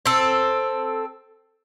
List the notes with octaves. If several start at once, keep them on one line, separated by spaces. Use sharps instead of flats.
C4 A4